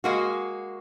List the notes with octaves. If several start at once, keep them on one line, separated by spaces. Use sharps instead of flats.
G#3 A#3 F#4